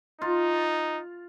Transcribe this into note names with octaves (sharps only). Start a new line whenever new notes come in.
D#4 F4